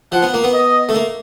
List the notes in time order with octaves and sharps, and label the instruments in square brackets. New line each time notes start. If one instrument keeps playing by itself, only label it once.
[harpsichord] F3 [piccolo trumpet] F#5
[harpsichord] B3
A#3
B3
[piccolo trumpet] D#5
[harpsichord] A3
A#3